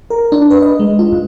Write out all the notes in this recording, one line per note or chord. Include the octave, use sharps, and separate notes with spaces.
A#4
D4
B4
D#5
G#3
F4
G2